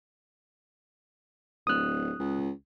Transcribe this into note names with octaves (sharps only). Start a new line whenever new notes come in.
D1 D#6 F#6
C#2